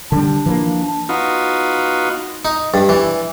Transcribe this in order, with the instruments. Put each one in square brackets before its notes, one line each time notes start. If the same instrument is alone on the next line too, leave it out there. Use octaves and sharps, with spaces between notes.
[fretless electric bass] D3 G3 [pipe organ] D4
[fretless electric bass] E3 F3 A#3
[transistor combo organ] B3 D#4 F4 F#4
[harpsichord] D#4
G2
E3